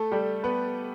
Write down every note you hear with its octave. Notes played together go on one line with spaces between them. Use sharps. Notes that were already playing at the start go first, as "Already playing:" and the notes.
Already playing: A3 A4
G3 G4
B3 B4